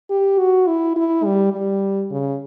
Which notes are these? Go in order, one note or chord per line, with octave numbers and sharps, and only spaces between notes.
G4
F#4
E4
E4
G3
G3
C#3